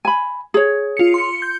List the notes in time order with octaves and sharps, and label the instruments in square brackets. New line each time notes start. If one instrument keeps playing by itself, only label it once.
[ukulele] G#5 B5
G#4 C#5
[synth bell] F4 C#7
C6 C#7
G6